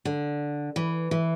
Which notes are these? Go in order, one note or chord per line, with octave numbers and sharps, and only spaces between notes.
D3
E3
E3